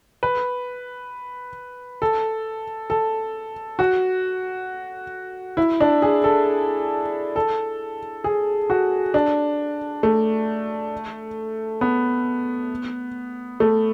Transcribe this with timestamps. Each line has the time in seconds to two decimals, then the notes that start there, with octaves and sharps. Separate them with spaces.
0.23 B4
2.02 A4
2.90 A4
3.79 F#4
5.57 E4
5.80 D4
6.02 G#4
6.24 A4
7.36 A4
8.24 G#4
8.70 F#4
9.14 D4
10.03 A3
11.81 B3
13.60 A3